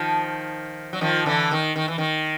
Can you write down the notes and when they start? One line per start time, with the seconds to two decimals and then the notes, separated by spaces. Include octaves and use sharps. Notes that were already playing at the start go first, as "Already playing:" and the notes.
Already playing: D#3 F3
0.93 F#3
1.01 D#3 F3
1.26 D3 E3
1.51 D#3
1.76 D#3
1.88 E3
1.98 D#3